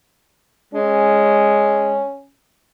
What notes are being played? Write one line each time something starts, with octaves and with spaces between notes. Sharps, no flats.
G#3 C#4